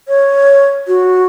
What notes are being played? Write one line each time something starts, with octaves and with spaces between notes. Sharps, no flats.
C#5
F#4